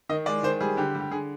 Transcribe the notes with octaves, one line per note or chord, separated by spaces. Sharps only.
D#3 D#5
G#3 D5
D#3 C5
G3 G#4
D3 G4
G3
G4
D3 G#4